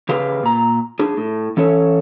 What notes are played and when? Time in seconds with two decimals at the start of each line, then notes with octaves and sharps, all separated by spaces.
0.09 C#3 G4 G#4 B4 F5
0.43 A#2 A#5
0.99 D4 G#4
1.17 A2
1.57 E3 C#4 A4 C#5